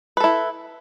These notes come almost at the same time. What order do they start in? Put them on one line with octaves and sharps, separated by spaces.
B4 A4 E4